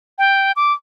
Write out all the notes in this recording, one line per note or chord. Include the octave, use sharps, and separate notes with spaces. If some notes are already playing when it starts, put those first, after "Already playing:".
G5
D6